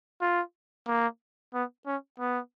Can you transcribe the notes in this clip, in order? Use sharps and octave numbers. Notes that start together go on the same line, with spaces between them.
F4
A#3
B3
C#4
B3